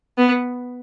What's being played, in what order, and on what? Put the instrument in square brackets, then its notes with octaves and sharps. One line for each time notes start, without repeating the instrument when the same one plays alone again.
[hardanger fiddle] B3